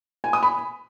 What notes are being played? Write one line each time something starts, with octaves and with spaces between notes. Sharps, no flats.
G#5
D#6
B5